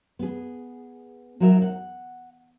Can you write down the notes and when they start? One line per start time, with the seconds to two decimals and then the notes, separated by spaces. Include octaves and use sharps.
0.19 B3 G#4
1.40 F#3 D#4 F#4 A#4 E5
1.62 F#5